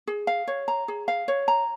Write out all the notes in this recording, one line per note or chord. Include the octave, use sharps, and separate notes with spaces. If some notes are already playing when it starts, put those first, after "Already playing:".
G#4
F5
C#5
A#5
G#4
F5
C#5
A#5